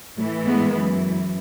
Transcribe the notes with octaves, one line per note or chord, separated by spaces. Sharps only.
A2 E3 F#3 A3
G#3 B3
F#2 E3